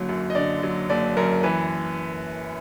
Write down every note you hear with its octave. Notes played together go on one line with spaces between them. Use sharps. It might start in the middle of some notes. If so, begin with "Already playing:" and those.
Already playing: F#1 D3 F#3
F#2
D#5
D3 D5
F#3
F#1 D5
F#2 A#4
E3 B4